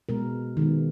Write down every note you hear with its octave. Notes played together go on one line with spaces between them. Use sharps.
B2 G#3 B3 A#4
D#3 G#3 B3